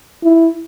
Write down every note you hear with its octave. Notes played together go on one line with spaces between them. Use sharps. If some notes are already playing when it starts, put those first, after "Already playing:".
E4